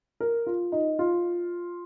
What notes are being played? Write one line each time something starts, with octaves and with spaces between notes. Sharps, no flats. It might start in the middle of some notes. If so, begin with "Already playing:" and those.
A#4
F4
D#4
F4